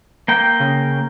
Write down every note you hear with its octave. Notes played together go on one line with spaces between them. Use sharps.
A#3 G5
C#3